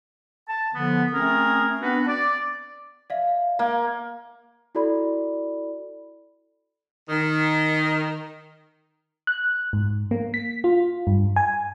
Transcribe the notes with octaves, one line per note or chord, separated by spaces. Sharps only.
A5
D3 F3 B3
A3 C4 C#4 G#4 A#4
B3 C4 D4 F#4 B4
D5
D5 E5 F5
A#3
E4 F#4 A4 D5 B5
D#3
F#6
G#2
A#3
B6
F4
G2
G#5